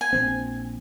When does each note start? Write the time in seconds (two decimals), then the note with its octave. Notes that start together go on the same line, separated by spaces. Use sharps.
0.01 G#5
0.13 A#1 C4